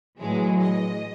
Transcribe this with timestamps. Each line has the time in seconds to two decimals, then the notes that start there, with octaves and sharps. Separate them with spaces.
0.19 A2 E3 F#3 G#3
0.61 D#5